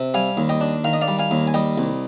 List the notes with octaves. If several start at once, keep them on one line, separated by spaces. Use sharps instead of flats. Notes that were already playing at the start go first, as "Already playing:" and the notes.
Already playing: C3
G3 F5 G#5
D#2
D#5 G5
D4
D#3 F5
D#5
D5 F5
G3
F5 G#5
D#2
G#5
G3 D#5 G5
C2